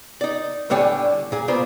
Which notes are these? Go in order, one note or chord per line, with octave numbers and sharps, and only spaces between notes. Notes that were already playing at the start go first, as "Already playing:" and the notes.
D#4 D5
A2 D3 G3 D4 C#5 G#5
A#2 G#4
A#3 B3 F4 C5 D5